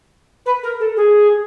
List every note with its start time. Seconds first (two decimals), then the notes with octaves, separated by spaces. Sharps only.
0.46 B4
0.63 A#4
0.80 A4
0.97 G#4